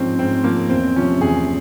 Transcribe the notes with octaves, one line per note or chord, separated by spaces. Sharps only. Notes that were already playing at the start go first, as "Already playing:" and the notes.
Already playing: G#2 F3 C4 C#4
G#2 C4
F3 A#3
E2 C4
C3 F3 C#4
E2 G#4